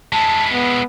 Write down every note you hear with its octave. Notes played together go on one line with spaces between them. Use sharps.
G#3 E4 A5
B3